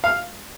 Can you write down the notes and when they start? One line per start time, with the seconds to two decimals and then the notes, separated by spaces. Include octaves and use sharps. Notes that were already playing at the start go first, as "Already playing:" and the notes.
0.04 F5